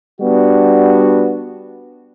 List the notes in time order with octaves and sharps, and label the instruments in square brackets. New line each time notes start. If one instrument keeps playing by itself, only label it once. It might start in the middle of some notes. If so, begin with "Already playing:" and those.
[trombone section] G3 B3 D4 F#4